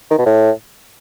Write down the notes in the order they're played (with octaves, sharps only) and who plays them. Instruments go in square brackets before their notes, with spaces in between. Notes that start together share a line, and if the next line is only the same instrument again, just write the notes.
[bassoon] D#3
B2
A2